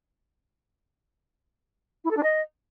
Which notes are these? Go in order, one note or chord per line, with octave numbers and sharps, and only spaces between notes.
E4
A4
D4
D#5